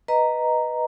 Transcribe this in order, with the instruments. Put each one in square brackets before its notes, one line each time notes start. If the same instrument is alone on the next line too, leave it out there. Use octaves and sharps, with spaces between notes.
[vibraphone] B4 D#5 A#5